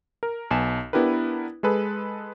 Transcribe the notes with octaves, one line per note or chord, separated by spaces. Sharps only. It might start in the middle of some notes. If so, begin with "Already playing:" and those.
A#4
B1 B3 G#5 A5 E7
B3 D4 E4 G4 A#4 B4
G#3 G#4 A4 B4